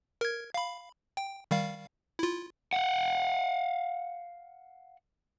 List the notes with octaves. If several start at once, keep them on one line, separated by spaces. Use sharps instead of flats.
A#4 G#6
F5 B5
G5
D#3 G3 F5
E4 F4
F5 F#5